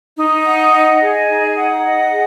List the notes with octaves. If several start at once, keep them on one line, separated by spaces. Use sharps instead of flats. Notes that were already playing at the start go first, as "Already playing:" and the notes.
D#4
F#5
D#5
G#4
D#4
F#5
D#5
G#4